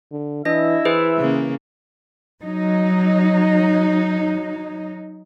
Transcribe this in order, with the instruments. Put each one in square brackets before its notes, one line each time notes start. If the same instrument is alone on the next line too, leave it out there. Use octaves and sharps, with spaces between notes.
[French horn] D3
[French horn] E3 [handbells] D4 D#5 A#6 [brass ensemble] E4 E5
[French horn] E3 [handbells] G#4 B4 C5
[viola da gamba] C#3 A#3
[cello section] F#3 D#4